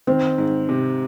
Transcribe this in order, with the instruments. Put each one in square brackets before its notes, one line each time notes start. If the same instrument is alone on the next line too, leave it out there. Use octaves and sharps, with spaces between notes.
[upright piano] D#3 [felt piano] C4
[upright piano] G#2
C3